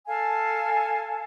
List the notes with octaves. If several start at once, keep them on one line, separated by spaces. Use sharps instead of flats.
A4 F5 G#5 A5